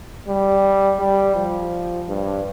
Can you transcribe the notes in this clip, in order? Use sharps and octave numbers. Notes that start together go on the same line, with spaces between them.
G3
G3
F3
G2